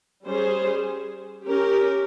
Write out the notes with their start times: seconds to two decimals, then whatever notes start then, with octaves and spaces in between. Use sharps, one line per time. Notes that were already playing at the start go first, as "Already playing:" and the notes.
0.24 G3 C#4 G#4 C5
1.45 C#4 G4 A#4